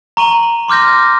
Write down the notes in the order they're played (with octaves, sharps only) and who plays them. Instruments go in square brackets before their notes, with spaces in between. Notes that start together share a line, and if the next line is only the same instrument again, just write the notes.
[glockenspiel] A#5 C#6 D#7 F#7
C6 D6 F6 G6 A#6